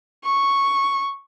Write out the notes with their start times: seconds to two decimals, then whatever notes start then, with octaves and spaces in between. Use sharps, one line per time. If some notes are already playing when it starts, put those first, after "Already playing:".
0.24 C#6